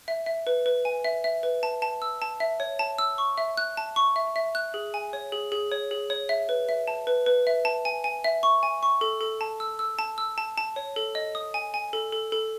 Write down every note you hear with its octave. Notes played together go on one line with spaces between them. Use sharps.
E5
E5
B4
B4
G#5
E5
E5
B4
A5
A5
E6
A5
E5
C#5
A5
E6
C#6
E5
F#6
A5
C#6
E5
E5
F#6
G#4
G#5
C#5
G#4
G#4
C#5
G#4
C#5
E5
B4
E5
A5
B4
B4
E5
A5
G#5
G#5
E5
C#6
G#5
C#6
A4
A4
A5
E6
E6
A5
E6
A5
A5
C#5
A4
D#5
D#6
G#5
G#5
A4
A4
A4